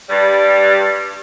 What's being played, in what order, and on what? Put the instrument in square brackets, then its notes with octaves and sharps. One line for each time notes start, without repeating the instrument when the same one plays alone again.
[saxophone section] G2 G3